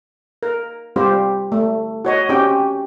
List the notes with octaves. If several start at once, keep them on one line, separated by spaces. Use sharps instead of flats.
A#4
G3 C4 F4 G4 C5
A3
F#4 C#5 D#5
C4 C#4 F#4 G4 G5